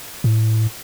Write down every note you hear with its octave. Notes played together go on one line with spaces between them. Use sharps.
A2